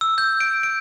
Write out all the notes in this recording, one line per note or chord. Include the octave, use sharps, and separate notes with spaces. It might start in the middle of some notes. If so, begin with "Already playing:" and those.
E6
G6
D7
D7